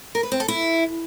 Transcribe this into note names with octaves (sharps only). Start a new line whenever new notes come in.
A#4
B4
C4
A4
E4